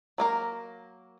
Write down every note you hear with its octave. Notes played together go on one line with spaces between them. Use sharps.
F#3 A#3 A#4